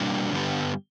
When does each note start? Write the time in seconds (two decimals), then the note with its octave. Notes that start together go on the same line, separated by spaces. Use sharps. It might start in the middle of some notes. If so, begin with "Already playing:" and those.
Already playing: B2 G3 A#3 D4 F#4
0.32 G2 D3 G3 B3